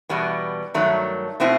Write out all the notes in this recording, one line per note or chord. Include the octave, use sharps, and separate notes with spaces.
E2 B2 G3 B3
G2 D#3 F#3 A3
B2 A3 C4 E4